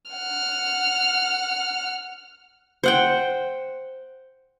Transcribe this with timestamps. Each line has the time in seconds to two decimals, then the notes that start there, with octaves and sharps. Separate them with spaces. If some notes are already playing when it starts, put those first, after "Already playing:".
0.11 F#5 F6
2.84 C5 F#5 G5